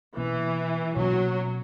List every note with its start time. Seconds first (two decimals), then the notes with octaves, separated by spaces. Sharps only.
0.17 B2 E3 A#3 C#4
0.96 B2 F#3 A#3 C#4